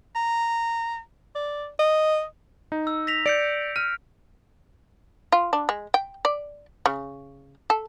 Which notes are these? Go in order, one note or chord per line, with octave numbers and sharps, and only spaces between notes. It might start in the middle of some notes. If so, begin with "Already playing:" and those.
A#5
D5
D#5
D#4
E6
A#6 B6 F7
D5 G6 C#7 D7
F6 D#7
F4
D4
G#3
G5
D5
C#3
A4